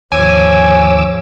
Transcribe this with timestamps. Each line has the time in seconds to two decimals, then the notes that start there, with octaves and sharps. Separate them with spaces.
0.12 D#2 G#2 F3 C#5 G#5 D6 E6